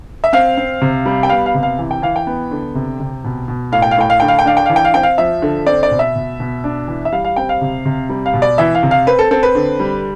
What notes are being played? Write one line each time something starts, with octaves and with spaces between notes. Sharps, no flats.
E5
C4 F5
C4
C3
G3
G5
B3 F5
F5
C3
F5
E3
G5
E3 F5
G5
B3
D3
C3
C3
B2
B2
A2 F5
G5
F5
A2 G5
F5
D3 G5
F5
G5
D4 F5
G5
E3 F5
G5
F5
C4 G5
F5
F3 E5
D3
C4 D5
D5
B2
E5
B2
B2
D4
E3
E5
G3 F5
F5
C4 G5
F5
C3
C3
G3
F5
B2
D5
E3 E5
F5
C3
F5
C4 B4
A4
C4 A4
B4
D3
G3